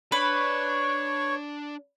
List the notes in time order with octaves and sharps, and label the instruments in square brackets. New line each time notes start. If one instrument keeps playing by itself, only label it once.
[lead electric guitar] D4 D5 [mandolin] B4 [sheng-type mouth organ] C#5 [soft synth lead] C#6